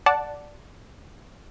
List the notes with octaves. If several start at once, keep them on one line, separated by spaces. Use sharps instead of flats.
D5 F#5 A5